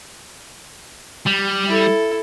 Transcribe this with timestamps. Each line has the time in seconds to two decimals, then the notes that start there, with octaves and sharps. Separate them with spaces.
1.27 G3
1.67 E4 A4